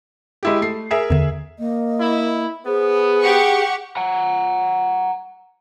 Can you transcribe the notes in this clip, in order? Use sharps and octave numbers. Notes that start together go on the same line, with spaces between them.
G#3 E4 G4
A3 C7
G#4 A#4 E5
E2 D3
A#3 D#5
E4
B3 G#4 C5
G4 F#5 C#6
F#5 A#5